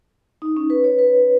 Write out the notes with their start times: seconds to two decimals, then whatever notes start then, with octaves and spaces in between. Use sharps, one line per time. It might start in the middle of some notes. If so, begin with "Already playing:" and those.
0.42 D#4
0.57 C#4
0.70 B4
0.84 C#5
0.99 B4